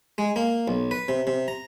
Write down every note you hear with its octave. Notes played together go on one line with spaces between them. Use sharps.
G#3
A#3
B1
B4
C3
C3
A#5